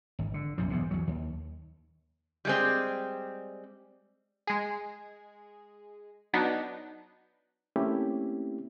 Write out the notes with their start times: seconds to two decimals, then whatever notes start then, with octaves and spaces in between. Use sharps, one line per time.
0.19 G#1
0.34 D3
0.58 B1 F#2 A#2 F3
0.70 B1 E2 G#2 C3
0.91 E2 F#3
1.08 D#2
2.45 G3 G#3 C4
4.47 G#3 G#4
6.33 F#3 B3 D4 D#4
7.76 A3 A#3 C4 C#4 E4 G4